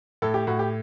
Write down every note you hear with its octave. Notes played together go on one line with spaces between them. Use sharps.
A2 A4
G4
A2 F#4
G4